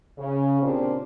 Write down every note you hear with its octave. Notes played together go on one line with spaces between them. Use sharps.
C#3
A#2 C#3 C4 D4 G4 C5